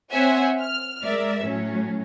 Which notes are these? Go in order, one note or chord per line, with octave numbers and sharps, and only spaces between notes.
C4 C5 C#5 E5 F#5 G#5
F6
G#3 A#4 D5 E5
A2 F#3 C#4